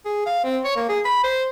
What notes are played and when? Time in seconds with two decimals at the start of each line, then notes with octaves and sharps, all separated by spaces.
0.05 G#4
0.26 F5
0.44 C4
0.65 C#5
0.76 A#3
0.89 G#4
1.05 B5
1.24 C5